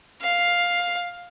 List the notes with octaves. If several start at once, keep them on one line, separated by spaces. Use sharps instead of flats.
F5